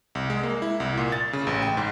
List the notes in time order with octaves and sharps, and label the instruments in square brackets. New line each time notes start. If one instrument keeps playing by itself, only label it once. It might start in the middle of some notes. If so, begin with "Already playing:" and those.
[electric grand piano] C2
G#3
A#3
E4
C2
A#2
A6
C#3
A1
G5
G#2